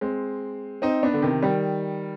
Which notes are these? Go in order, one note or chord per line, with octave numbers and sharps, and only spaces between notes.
G#3 C4
C4 D#4
B3 D4
D3
C3 D#3
D#3 G3